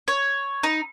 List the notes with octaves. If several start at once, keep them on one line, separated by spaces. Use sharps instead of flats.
C#5
D#4